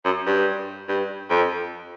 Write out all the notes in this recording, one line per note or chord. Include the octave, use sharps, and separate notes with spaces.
F#2
G2
G2
F2